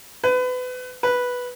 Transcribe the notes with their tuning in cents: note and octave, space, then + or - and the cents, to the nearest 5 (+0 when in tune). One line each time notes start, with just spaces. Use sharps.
B4 +30
B4 -5